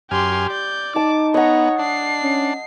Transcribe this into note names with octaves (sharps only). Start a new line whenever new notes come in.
F#2 G4 G#5 C6 F6
D5 G6
D#4 A5 D6
B3 C#5 D#5 F#5 A#5
D4 C7
C#4